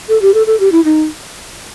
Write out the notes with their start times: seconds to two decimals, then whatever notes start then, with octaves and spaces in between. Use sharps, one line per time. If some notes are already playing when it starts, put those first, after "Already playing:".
0.09 A4
0.22 G4
0.34 A4
0.47 A4
0.60 G4
0.72 E4
0.85 D#4